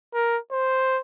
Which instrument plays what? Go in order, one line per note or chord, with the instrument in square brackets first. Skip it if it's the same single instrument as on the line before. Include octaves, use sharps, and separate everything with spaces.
[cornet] A#4
C5